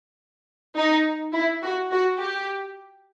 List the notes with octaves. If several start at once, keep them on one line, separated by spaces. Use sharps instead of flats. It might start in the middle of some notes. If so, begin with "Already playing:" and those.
D#4
E4
F#4
F#4
G4